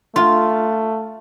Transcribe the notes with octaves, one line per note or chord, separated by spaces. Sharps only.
A3 F4